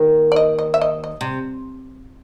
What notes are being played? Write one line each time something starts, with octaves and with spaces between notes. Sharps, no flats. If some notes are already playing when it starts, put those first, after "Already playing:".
Already playing: D#2 D#3
D5
D#5
D#5
E5
D#5
D#5
C3